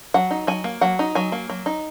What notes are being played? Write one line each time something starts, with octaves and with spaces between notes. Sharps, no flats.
F#3 F#5
D#4
F#3 G#5
A#3
F#3 F#5
D#4
F#3 G#5
A#3
F#3
D#4